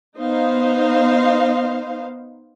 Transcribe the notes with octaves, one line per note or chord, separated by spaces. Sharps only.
B3 D#4 C5 F5